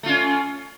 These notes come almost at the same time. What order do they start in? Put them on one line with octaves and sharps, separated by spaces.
A3 F4 C#4